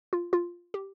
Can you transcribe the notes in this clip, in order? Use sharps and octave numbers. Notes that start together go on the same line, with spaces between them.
F4
F4
G4